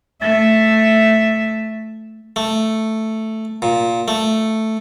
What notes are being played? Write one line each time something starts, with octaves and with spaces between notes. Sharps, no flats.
A3 E5
A3
A#2
A3